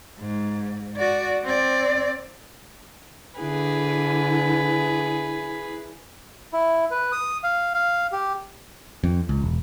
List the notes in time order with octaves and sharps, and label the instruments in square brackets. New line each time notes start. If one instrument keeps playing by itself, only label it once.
[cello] G#2
F#4 D5
C4 D5
[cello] D3 [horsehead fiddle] E4 [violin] G#4 B4
[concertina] E4
B4
D#6
F5
F5
G4
[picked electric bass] F2
C#2
E1